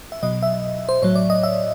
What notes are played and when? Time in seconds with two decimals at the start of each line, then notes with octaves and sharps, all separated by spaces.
0.12 E5
0.23 B2 F#3 D#5
0.43 E5
0.89 C5
1.02 A2 F#3 C#5
1.15 D5
1.30 D#5
1.43 E5